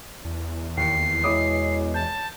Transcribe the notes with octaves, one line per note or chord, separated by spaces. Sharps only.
E2
D#2 C7 C#7
B2 G#3 E4 C#5 D6 D#6
A5 G6